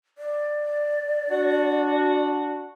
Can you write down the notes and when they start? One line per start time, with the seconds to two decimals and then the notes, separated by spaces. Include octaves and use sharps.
0.18 D5
1.30 D4 F#4